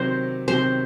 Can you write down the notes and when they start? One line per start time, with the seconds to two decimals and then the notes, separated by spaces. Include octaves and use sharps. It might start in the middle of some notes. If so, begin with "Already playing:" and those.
Already playing: C3 D#3 F#3 C5
0.48 C3 D#3 F#3 C5